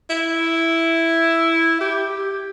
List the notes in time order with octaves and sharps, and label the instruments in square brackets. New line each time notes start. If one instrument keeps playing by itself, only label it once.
[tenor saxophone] E4
G4
G4